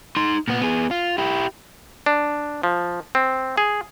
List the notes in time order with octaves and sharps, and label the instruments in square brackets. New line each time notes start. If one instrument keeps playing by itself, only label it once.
[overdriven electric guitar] D#4 C6
A#2 B3
B3 G#4
F4
E4 G4
[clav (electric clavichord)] D4
F3
C4
G#4